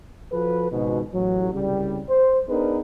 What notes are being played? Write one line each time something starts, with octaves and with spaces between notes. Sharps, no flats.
F3 F#4 A4 B4
G#1 C#2 G#2 B2
A1 F#3
C2 C#3 G3
C5
B3 D4 D#4 G#4 A#4 B4